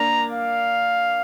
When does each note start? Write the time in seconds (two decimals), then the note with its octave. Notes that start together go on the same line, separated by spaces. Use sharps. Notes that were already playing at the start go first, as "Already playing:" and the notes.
Already playing: A#3 D4 A#4 A#5
0.32 F5